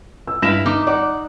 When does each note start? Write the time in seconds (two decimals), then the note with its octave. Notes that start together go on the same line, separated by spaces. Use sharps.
0.27 E6
0.42 G2 E4 F5 B5 A#6 E7
0.66 D#4 D6
0.87 D5 F#5 D6